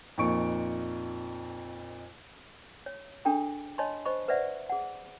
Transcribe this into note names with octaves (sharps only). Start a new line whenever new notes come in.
F2 A#2 D#4 C#6 D7
C#5
D4 G#4 A4 G5 A#5
C#5 D#5 G#5 A5 B5 C6
C5 D#5 B5 C#6
B4 C5 D5 E5 F#5
G#4 F#5